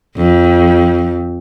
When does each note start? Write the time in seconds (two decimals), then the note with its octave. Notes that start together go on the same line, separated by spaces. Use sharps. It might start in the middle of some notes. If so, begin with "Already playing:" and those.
0.17 F2